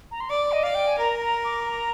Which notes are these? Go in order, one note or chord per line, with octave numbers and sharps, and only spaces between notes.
A#5
C6
D5 D6
D#5
D5 F5
G5
G#5
A#4 A#5
A#5
D6
A#5